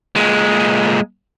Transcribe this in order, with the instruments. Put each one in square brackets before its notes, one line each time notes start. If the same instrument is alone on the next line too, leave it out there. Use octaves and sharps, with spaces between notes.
[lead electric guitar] A#2 G#3